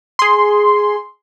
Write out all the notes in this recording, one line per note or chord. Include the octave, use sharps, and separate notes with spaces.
G#4 C6